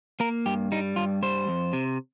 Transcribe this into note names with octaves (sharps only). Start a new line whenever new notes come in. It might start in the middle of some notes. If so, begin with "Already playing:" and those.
A#3 A#4
G2 G4
G3 D#4
G2 F4
G3 C5
F2
C3